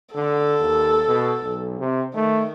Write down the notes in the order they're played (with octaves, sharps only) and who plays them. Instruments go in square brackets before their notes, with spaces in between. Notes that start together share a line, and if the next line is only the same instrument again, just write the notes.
[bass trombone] D3 [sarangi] A4
[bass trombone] D#2
B2
B1
C3
[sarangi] D#3 [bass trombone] A3